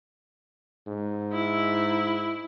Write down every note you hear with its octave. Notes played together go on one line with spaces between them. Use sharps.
G#2
E4